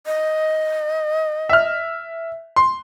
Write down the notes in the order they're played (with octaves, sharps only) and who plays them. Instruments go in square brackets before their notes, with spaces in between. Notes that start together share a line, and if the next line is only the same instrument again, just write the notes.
[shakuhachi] D#5
[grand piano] E5 F6
C6